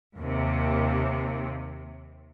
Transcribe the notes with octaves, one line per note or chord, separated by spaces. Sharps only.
D#2 C3